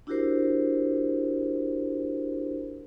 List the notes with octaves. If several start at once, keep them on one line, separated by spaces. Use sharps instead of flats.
D4 E4 F#4 G4 A#4 C5